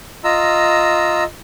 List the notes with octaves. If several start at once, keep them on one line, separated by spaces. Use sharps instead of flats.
F4 D#5 A#5 E6